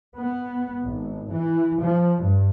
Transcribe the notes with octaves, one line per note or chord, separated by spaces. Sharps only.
B3
G#1
E3
F3
G2